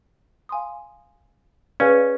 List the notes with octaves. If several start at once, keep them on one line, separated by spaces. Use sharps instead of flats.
F5 G#5 C6 D#6
C#4 G#4 B4 D5 F5 G#5